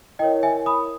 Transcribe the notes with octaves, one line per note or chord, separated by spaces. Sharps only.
E4 A#4 C#5 D#5 G5
E5 G#5
B5 D#6